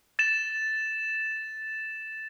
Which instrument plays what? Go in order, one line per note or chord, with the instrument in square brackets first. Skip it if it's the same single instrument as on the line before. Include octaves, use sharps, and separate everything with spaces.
[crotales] A6 E7